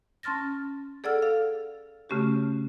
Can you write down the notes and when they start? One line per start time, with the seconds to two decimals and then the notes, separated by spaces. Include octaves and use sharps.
0.23 C#4 A5 C6 F6 A6 A#6
1.04 G#4 A4 D5 F#5 E6 F6
1.22 A4 F5
2.09 C#3 A3 C#4 F#4 G4